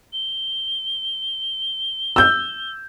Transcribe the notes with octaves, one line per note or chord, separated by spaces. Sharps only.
G7
E6 G6